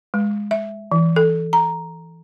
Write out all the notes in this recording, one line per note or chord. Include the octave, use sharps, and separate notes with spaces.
G#3
E5
E3
A4
A#5